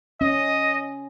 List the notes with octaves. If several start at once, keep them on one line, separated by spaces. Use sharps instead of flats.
C#4 D#5